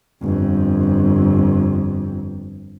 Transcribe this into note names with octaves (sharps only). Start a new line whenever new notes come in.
G1 F2